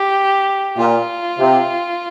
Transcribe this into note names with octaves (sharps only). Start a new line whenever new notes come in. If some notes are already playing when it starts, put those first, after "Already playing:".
Already playing: G4
A#2 F4
C3